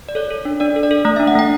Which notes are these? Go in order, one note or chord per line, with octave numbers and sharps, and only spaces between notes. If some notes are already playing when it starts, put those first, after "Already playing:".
D5
A4 C#5
A4
D4
D4 D5
A4
D5
A4
A3 D5
D4 E5
F#5
A3 G5